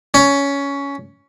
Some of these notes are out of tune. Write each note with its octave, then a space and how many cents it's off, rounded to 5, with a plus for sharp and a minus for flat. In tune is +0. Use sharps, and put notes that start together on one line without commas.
C#4 +15